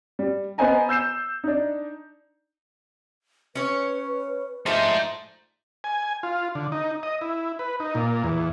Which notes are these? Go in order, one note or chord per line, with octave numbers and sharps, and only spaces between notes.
G3
B3 B4 C5 D#5 G#5 A#5
E6 G6 C7 E7
D4 D#4
C#4 B4 C#5
F3 A3 D4 D#4 C5
G#5
F4
D3
D#4
D#5
E4
B4
D#4
A#2
E2